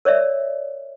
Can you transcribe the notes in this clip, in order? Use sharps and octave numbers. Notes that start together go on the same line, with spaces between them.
A#4 C#5 D5 E5